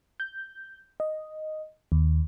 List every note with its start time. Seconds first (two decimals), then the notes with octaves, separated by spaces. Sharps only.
0.20 G6
1.00 D#5
1.92 D#2